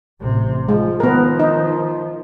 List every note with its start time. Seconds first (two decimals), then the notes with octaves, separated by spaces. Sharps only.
0.21 A1 C3
0.69 F3 G#3
1.00 D#3 F3 B3 A#4
1.39 D#4